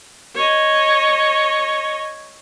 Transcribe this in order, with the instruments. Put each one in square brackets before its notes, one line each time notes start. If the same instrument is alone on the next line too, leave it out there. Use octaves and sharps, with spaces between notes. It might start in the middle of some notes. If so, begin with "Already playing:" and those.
[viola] C#5 D#5